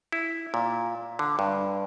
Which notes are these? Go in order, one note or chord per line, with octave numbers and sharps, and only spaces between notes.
E4
A#2
D3
G2